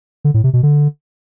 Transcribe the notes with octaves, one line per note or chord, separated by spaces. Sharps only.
D3
A2
C3
B2
D3